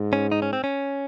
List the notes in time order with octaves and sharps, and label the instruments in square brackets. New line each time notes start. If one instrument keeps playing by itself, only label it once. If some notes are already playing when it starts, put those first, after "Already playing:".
Already playing: [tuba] G#2
[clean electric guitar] C#4
D#4
C#4
C4
C#4